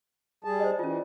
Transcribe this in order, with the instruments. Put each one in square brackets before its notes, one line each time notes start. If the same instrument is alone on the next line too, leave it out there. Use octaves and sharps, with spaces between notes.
[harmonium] G3 G#4 A5
[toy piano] C5 D5 D#5
[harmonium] E3 [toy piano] C#4 F4